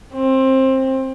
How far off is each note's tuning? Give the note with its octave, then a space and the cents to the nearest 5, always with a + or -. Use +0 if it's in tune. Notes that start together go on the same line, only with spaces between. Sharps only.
C4 +20